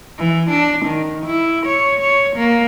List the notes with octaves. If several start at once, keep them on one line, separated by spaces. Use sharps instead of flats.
E3
D4
D#3
E4
C#5
C#5
A#3